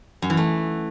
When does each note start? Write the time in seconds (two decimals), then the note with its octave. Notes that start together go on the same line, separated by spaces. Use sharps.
0.22 F#2
0.30 E3
0.37 A3